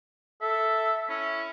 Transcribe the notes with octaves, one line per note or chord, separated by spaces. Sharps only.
A4 E5
C#4 E4